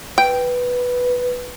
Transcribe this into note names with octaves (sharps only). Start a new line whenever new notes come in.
B4 G5